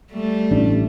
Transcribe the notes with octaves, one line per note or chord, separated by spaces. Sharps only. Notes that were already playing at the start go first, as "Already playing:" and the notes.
G3 A3
A1 D4